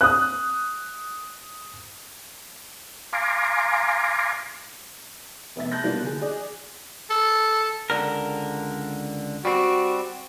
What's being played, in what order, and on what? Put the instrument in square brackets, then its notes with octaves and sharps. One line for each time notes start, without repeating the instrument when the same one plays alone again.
[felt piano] D#6 F#6
[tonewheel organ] F5 G#5 A#5 C6 D6
[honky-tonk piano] F1 B3 E5 A6
A5 F#6 G6 A#6
B2 G3 A#3 B3 D4 F4
D3 E3 G#4
G#4 D5 D#5
[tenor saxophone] A4
[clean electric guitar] C#2 D3 A#4
[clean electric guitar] G3 C4 [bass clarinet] F#4